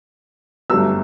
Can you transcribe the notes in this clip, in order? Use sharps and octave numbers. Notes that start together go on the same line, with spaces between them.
G1 G2 F#3 A3 E6